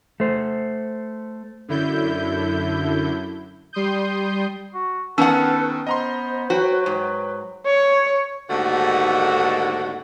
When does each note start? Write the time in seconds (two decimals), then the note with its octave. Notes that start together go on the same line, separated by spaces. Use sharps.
0.20 A3 C5
1.68 F#2 D3 E4 G6
3.73 G3 C6 D#6 G6
4.74 F#4
5.18 D#3 B3 C#4 A4 B4 F#5 E6
5.87 B3 C5 D#5 A#5 C6
6.50 F#3 F#4 B4 G5
6.86 G#2
7.66 C#5
8.50 D#2 G#2 D3 A3 A#3 F#4